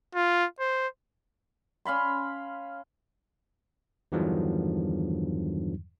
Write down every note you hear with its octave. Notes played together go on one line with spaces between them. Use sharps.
F4
C5
C#4 F5 B5 C6
E2 G2 D3 D#3 F3 F#3